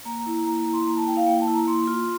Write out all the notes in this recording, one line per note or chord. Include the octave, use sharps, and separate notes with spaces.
A#3 A#5
A#5
E4
A#5
A#3 A#5
A#5
E4
C6
A#3 A#5
A5
E4 G5
F5
A#3 G5
A5
E4
A#5
A#3 C6
F4